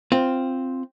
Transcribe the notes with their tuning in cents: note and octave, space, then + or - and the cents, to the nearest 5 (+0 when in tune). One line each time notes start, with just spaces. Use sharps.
C4 +0 F4 +0